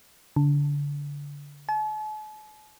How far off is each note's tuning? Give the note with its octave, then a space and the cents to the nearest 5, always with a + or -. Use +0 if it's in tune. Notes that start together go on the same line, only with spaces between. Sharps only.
D3 -30
A5 -45